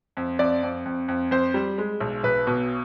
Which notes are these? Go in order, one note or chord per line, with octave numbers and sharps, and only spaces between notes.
F2
F2 D5
F2
F2
F2
F2 C5
G3
G#3
B1
B1 B4
B2